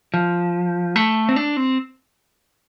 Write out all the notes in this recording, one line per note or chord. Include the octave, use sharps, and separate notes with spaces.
F3
A3
C4
D4
C4